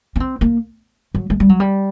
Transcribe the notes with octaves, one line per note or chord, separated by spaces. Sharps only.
C#4
C4
A#3
F#3
G#3
G3
F#3
G3